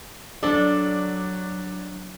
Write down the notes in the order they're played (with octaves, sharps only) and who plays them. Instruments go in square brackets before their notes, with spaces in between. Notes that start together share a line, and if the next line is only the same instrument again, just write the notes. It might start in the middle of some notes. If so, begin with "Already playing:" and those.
[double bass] F#3 [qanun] D4 A4 [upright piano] D5